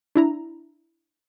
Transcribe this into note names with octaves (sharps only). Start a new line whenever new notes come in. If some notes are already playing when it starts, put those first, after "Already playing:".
D4 E4 A#5